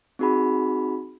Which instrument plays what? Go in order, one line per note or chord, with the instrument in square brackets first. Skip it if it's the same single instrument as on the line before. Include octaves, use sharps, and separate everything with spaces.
[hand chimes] C4 D#4 F#4 G#4 B5